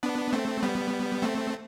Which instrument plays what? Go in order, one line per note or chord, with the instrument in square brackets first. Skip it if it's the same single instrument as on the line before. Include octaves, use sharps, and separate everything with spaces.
[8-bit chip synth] B3 D4
A3 C4
G3 B3
A3 C4